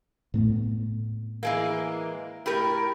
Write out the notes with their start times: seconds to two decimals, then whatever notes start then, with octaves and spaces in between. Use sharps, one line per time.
0.34 A2 A3 B3
1.43 E3 G#3 A#3
2.46 A2 G4 A#4